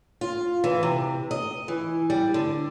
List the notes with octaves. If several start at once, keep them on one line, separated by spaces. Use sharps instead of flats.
F4
E3
C3
D#5
E3
G3
D3